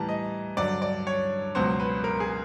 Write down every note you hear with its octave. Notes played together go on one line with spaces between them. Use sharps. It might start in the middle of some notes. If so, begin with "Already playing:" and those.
Already playing: A2 E3 G3 A5 A#5
D#5
G2 D3 F#3 D5
D5
C#5
C#2 B2 F#3 C5
B4
A#4
G#4